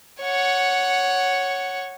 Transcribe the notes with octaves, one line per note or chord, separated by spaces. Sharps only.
C#5 F#5